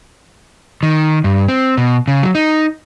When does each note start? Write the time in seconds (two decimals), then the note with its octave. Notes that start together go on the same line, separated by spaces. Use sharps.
0.83 D#3
1.24 G2
1.48 C4
1.78 B2
2.08 C#3
2.23 F#3
2.35 D#4